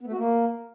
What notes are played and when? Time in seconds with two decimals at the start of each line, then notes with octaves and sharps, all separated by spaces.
0.01 B3
0.06 A3
0.12 F#4
0.18 A#3